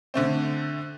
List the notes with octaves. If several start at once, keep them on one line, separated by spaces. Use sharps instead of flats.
D3 A3 C4